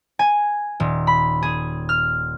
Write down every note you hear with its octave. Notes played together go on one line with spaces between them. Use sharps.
G#5
D#1
B5
G#4
F6